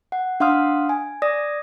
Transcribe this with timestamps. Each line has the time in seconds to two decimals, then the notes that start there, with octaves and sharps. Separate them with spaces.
0.12 F#5
0.40 D4 F5 F#5 C6 D#6 F6
0.89 G#5
1.22 D5 D#6 A#6